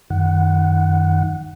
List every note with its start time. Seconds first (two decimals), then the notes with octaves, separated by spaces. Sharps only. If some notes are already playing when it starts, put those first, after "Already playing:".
0.10 F#2 D#3 F#5